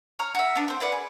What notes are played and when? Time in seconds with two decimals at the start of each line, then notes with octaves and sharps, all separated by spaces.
0.19 C#5 A#5 F6
0.35 F#4 E5
0.55 B3 D4
0.68 C4 C5
0.80 E4 B4 D5 F#5
0.92 G#4